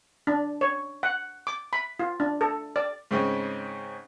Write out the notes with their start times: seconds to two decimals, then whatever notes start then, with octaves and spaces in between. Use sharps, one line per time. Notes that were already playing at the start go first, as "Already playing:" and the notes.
0.27 D4
0.61 C#5
1.03 F#5
1.47 D6
1.73 B5
1.99 F4
2.20 D4
2.41 A4
2.76 D5
3.11 G#2 C#3 C4 C#4 D#4